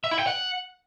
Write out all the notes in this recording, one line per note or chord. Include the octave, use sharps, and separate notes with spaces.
E5
E4
G5
F#5